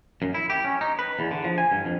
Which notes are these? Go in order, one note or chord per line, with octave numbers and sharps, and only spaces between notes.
F#2
E4
G4
C#4
D#4
B4
E2
D3
F3
G#5
G2
F2